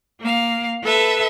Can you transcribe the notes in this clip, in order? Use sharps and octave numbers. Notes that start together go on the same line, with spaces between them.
A#3 F5
A4 B4 E5 A5